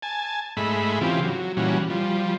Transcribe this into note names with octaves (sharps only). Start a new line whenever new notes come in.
G#5 A5
G#2 G#3 A3 E5 B5
C#3 E3 C4 F4 G4
F#3
A#2 E3 G3 C#4 F#4
F3 G3